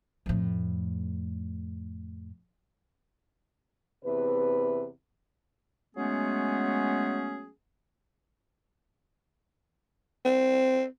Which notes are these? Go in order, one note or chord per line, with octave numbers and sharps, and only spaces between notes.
F2 A2
E2 C3 B4
F#3 G#3 A3 B3 C#4 G#4
C4